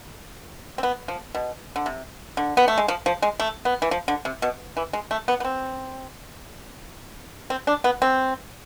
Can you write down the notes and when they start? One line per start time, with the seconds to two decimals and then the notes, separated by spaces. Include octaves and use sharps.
0.78 C4
0.83 B3
1.08 F3
1.35 B2
1.76 D3
1.86 C3
2.37 D3
2.57 B3
2.68 A3
2.78 G#3
2.88 F3
3.06 F3
3.22 G#3
3.40 A3
3.65 B3
3.82 E3
3.91 F3
4.08 D3
4.25 C3
4.42 B2
4.77 E3
4.93 G#3
5.11 A3
5.28 B3
5.40 B3
5.45 C4
7.50 C4
7.67 D4
7.84 B3
8.02 C4